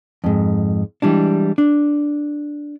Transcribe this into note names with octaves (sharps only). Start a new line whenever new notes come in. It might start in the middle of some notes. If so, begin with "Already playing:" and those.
F2 G#2
E3 G3 G#3 D4
D4